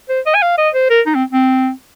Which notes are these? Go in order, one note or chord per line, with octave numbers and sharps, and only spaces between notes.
C5
D#5
G#5
F5
D#5
C5
A#4
D#4
C4
C4